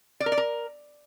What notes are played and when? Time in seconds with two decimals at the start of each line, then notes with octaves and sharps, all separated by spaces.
0.20 D5
0.26 A#4
0.32 D5
0.38 A#4